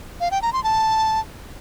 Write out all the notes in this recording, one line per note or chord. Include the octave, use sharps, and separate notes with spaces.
F5
G5
A#5
C6
A5